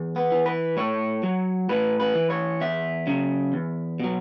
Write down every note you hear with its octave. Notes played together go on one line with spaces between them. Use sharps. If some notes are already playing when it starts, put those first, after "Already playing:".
Already playing: E2
B3
E3
B4
A2 C#5
F#3
A2 B4
B4
E3
C#5
E2 E5
C#3 F#3
E2
B2 F#3